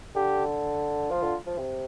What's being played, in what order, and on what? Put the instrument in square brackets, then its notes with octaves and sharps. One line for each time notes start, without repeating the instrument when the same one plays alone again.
[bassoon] D3 [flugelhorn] G4
[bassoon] F3 [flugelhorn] F4
[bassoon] D3
F3
C3